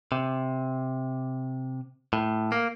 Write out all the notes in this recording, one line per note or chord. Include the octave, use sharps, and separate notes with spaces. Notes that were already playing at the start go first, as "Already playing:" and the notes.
C3
A2
A#3